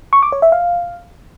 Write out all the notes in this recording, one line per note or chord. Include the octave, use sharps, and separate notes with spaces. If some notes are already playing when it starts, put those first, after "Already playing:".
C#6
D6
C#5
E5
F5